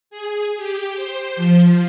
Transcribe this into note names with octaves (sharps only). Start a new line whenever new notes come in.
G#4
G4
C5
F3